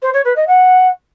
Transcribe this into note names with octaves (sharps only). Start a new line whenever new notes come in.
C5
C#5
B4
D#5
F#5